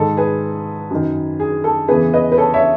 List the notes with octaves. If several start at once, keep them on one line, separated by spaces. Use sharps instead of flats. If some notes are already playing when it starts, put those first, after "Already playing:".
Already playing: G#2 D#3 A4
G#4 B4
F#2 D#3
G#4
A4
E2 C#3 E3 G#4 B4
B4 D#5
B4
A4 C#5
C#5 E5